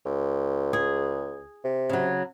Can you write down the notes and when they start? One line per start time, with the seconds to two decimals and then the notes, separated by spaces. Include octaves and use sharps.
0.06 C#2
0.73 G#4
1.64 C3
1.90 C#3 F#3